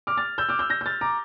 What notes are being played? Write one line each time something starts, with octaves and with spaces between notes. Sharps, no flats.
D6 F6
F6 A6
E6 G6
D6 F6
E6 G6
G6 A#6
G6
F6 A6
A#5 D6